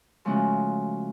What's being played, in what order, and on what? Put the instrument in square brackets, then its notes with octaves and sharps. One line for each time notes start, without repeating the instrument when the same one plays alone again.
[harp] C#3 F3 G#3 A3 C#4 F#4